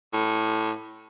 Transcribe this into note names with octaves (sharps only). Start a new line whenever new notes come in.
A2